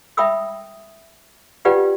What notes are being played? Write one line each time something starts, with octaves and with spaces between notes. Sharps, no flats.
E5 G5 B5 D#6 E6
F4 G4 B4 D5 F#5 G5